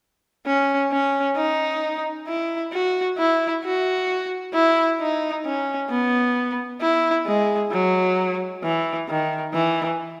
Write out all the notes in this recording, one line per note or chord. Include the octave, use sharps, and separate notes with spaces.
C#4
C#4
D#4
E4
F#4
E4
F#4
E4
D#4
C#4
B3
E4
G#3
F#3
E3
D#3
E3